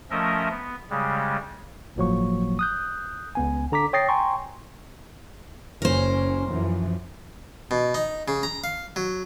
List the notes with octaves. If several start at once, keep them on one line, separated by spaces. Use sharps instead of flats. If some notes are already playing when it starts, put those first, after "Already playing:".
F3 A3 C#4 A#4 D#5 E5
B3
C#3 G3 G#3
G1 A2 F3 F#3 A#3 C#6
D#6 F#6 G6
C#2 B3 G#5
D3 A#5 D6 B6
C#5 G5 D#6 A6 A#6 C7
G5 G#5 A#5 C6 C#6
F#1 C#4 A#4 C5
F#2 E3 F3
B2
D#4
C#3
A#5
F5
F#3